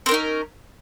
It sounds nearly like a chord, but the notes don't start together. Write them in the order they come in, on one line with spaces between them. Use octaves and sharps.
C4 A#4 D#4 C#4